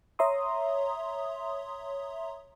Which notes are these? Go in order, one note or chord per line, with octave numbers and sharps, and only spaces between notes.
C#5 E5 A#5 C6 D#6